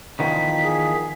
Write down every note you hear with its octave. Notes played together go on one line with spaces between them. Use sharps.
E2 D#3 F3 B6
G#4